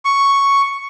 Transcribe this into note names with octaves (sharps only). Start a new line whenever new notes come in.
C#6